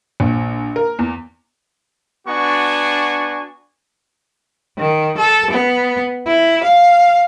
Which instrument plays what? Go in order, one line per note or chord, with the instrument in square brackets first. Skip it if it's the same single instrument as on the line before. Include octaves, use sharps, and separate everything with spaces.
[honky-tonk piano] A#1
A#4
E2
[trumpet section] B3 D4 F#4 G#5 C#6
[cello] D#3
A4
B3
E4
F5